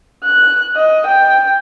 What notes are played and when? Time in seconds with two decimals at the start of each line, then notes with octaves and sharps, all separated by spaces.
0.25 F#6
0.76 D#5
1.07 G5